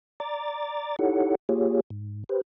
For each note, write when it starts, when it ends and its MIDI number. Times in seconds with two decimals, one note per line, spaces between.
0.20 0.96 74
0.20 0.96 82
0.20 0.96 86
0.20 0.96 93
0.99 1.35 63
0.99 1.35 64
0.99 1.35 67
0.99 1.35 69
0.99 1.35 73
0.99 1.35 78
1.49 1.80 58
1.49 1.80 65
1.49 1.80 67
1.49 1.80 68
1.49 1.80 73
1.90 2.24 44
2.29 2.41 67
2.29 2.41 71
2.29 2.41 72